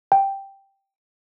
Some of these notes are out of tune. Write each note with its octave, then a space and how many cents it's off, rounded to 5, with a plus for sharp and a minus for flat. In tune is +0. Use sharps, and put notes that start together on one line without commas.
G5 +0